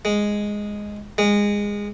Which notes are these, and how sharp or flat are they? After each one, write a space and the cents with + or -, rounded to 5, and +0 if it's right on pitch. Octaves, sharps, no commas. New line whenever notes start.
G#3 -5
G#3 -20